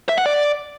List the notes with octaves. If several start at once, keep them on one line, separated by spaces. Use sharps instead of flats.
E5
F#5
D5